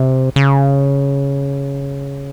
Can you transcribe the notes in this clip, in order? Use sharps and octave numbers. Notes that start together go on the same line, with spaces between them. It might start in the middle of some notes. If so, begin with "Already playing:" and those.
Already playing: C3
C#3